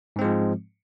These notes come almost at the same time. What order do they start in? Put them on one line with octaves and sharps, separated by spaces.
G#2 C4 G#3 F3